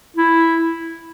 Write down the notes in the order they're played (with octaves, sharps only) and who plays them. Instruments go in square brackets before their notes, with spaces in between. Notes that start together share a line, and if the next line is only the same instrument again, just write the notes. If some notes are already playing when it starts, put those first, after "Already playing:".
[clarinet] E4